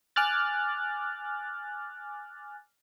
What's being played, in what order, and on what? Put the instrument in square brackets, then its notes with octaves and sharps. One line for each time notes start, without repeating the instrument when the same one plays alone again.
[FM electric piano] G#5 D6 F6 F#6 A6